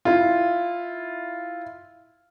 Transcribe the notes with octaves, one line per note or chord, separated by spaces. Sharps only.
E4 F4